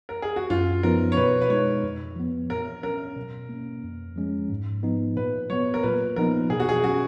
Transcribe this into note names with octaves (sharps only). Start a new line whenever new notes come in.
A#4
G#4
F#4
F#2 F4
F3 B3 D#4 A#4
C#5
B2 B4
B4
G#3 D#4 C#5
F2
F3 B3
A#2 A#4
F#3 C#4 A#4
B2
A#3 C#4
F2
F3 G#3 C#4
G#2
F3 B3 D#4
A#2 B4
F#3 B3 C#5
A#4
A#2 B4
F3 B3 D#4 A#4
B2 G#4
F#4
G#4
F#3 C#4 F#4